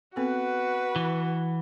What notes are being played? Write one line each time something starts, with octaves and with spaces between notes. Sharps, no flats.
B3 C4 F#4 A4 B4
E3